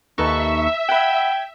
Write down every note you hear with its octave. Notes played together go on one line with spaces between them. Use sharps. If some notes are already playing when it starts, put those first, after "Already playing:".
D#2 D#4 A4 B4 E5 C#6
F#5 G5 B5 G#6